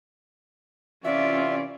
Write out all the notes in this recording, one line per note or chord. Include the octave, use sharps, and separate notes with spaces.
C3 E3 C#4 F4 D5 E5